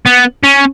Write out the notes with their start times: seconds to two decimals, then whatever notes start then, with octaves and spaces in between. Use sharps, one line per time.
0.06 B3
0.44 C#4